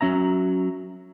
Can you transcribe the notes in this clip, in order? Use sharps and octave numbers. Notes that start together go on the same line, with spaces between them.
F#3 C#4 E5 A#5